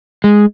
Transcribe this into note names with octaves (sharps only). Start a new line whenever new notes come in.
G#3